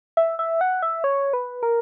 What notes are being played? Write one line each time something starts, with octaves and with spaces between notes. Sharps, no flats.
E5
E5
F#5
E5
C#5
B4
A#4